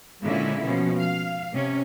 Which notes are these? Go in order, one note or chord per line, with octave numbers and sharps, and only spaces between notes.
A#2 D3 G#3 A#3 C#4 E4
B2 F3 C#4
F5
C3 C#4